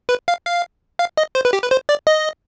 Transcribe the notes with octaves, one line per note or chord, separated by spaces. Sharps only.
B4
F5
F5
F5
D#5
C5
B4
G4
B4
C5
D5
D#5